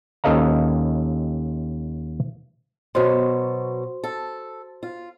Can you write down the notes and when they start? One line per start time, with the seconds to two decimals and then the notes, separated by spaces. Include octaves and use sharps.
0.24 D#2 C#4 A4 D#5 F5 A#5
2.95 B2 F#3 F#4 C5 C6
4.04 A4
4.83 F4